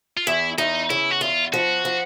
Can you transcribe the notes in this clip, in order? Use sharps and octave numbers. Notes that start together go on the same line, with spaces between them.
F4
E2 E4
E2 D#4
C#3 E4
F#4
E2 F4
F3 F#4
F3